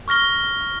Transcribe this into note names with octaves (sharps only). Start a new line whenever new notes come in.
C#6 F6 A#6 G7